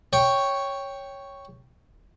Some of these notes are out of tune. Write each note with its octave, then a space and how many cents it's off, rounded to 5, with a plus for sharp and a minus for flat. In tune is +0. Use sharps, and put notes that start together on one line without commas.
C#5 +0 G5 +0